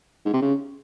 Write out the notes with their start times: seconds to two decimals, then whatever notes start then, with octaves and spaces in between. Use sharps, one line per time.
0.26 G#2
0.34 C3
0.42 C#3